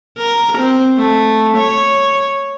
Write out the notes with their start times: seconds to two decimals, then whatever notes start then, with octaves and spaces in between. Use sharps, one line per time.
0.18 A#4
0.57 C4
0.98 A3
1.57 C#5